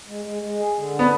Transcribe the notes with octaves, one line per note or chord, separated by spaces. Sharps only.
G#3
G#3
G#3
G#4
D3
D4
B3